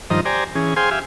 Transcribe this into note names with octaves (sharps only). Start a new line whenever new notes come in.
G2 D#3 F3 C5 D#5 A#5
G4 C5 D5 G#5 A#5
E3 C#4 G#4
G#4 C5 F5 G5 G#5 C6
G4 E5 F5 G#5